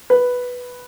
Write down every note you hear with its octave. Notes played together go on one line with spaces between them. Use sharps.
B4